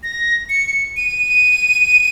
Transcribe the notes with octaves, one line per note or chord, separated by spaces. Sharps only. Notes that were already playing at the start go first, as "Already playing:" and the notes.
A#6
C#7
D#7